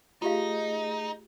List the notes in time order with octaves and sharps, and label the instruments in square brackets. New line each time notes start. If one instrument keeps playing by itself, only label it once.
[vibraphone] A3 G#4 [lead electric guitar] D#4 [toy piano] F4 G4 F5 [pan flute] D#5